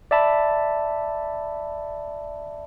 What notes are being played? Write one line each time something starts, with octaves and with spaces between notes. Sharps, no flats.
D5 E5 A5 B5